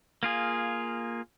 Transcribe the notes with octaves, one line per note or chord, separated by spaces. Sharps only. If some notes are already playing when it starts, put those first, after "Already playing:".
A#3 F4 G#4